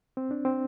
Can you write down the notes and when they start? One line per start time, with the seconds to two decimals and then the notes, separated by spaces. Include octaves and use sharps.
0.17 C4
0.31 D4
0.45 C4